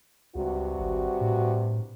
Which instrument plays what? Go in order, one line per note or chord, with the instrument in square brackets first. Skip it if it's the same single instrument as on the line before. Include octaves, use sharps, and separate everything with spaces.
[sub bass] C#2 [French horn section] G2 C3 F#4
[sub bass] G#1
A2